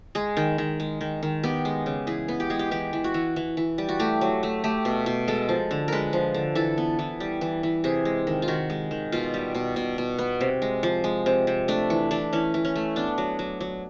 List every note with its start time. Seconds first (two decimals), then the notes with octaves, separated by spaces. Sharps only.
0.15 G#3 G#4
0.37 D#3
0.58 D#3
0.80 G#3
1.01 D#3
1.23 D#3
1.43 B3 G4
1.65 G#3
1.86 C#3
2.07 E3 G#4
2.28 B3
2.40 G4
2.50 G#3 G#4
2.59 G4
2.71 E3 G4
2.93 E3
3.04 F#4
3.14 E3
3.36 E3
3.57 E3
3.78 G3
3.89 F#4
4.00 A3 G4
4.21 F#3
4.43 A3
4.64 A3 G4
4.85 B2
5.06 B2
5.28 G#3 A4
5.49 F3
5.71 D3
5.88 G#3 A#4 B4
6.13 F3
6.34 D3
6.55 E3 A4
6.78 B3
6.99 E3
7.20 G3
7.41 E3
7.63 E3
7.84 C3 G#4
8.05 G#3
8.27 D#3
8.42 F4
8.48 D#3 F#4
8.70 G#3
8.91 D#3
9.12 B2 F4
9.34 G3
9.55 B2
9.76 B2
9.98 B2
10.19 B3
10.41 C3
10.62 G#3
10.83 F3
11.04 G#3
11.26 C3
11.47 C3
11.68 A3 D4
11.90 E3
12.11 E3 D4
12.33 E3 C#4
12.54 E3
12.65 C#4
12.76 A3
12.96 B3 D4
13.18 F#3
13.39 F#3
13.61 F#3